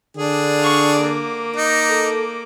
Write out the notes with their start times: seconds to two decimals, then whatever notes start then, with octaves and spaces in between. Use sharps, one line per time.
0.17 D3 D4 G#4
0.59 F5 C#6
0.96 A#3 D6
1.56 D#4
1.89 A4